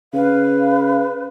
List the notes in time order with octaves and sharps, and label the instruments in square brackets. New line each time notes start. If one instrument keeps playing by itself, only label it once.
[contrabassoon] C#3 [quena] B4 [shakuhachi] F5